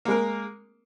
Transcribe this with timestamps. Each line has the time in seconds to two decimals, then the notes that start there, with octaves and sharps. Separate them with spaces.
0.05 A#3
0.08 G#3
0.11 A#4